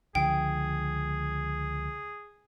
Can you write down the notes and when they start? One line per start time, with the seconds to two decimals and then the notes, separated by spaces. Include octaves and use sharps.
0.15 C#2 D3 F3 G#4 G5